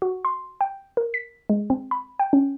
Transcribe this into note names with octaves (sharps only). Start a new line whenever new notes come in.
F#4
C6
G5
A#4
B6
G#3
C4
B5
G5
C#4